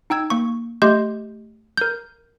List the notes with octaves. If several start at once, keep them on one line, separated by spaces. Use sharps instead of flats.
D#4 G5 E6 G#6
A#3 C#6
A3 G4 D#5 C6 G6
A#4 G6